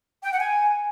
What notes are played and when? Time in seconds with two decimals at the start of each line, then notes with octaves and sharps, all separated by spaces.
0.23 G5
0.32 F#5
0.40 G#5